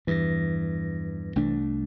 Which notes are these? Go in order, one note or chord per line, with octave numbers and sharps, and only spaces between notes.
E2 G2 E3 A#6
C2 A3 D4